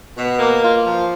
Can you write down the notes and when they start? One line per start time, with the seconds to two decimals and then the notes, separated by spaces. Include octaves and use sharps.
0.17 B2
0.39 A#3
0.63 F4
0.84 F3